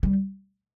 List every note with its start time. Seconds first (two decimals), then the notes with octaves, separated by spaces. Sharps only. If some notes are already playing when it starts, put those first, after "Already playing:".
0.03 G3